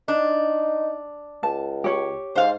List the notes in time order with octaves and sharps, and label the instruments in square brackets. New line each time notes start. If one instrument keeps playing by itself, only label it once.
[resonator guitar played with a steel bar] D4 [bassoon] D#4
[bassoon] C#2 [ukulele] A5
[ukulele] G4 C#5
[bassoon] G#2 [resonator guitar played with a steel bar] C5 F5